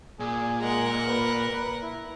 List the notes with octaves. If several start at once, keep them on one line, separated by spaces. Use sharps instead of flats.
A#2 G#4
G#3 A#4 F#5
B4
E4